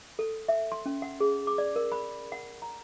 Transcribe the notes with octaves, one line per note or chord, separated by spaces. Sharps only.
A4
E5
C6
C#4
F#5
G#4
D6
D5
A#4
B5
F#5
A#5